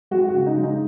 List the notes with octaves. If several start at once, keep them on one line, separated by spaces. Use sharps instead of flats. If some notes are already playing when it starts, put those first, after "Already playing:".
G#3 F#4
F#4
C#3
D#4
G#3
D#4